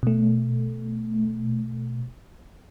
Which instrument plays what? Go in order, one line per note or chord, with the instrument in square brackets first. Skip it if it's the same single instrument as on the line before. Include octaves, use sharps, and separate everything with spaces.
[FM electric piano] B2 A3